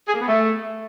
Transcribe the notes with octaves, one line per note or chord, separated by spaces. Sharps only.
G#4
A#3
B3
A3